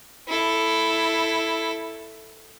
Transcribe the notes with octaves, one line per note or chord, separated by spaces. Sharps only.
E4 A4